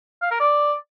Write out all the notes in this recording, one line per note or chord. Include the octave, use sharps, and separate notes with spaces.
F5
A#4
D5